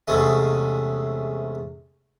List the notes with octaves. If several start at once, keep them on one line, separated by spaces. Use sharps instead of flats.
E2 G#2 C3 G#3 A3 C#4